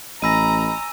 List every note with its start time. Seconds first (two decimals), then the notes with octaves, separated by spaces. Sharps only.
0.22 A1 D#5 G#5 A#5 B5 E6 A#6 D#7